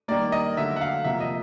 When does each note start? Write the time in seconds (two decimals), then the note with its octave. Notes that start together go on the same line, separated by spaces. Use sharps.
0.08 D#3 G3 A#3 D5
0.32 D#5
0.57 D3 F#3 A3 E5
0.76 F#5
0.81 F5
1.04 C3 F3 A#3 E5
1.20 D#5